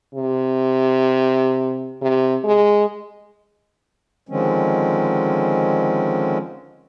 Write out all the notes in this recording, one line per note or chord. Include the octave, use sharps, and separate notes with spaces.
C3
C3
G#3
D3 D#3 F3 G#3 C4 C#4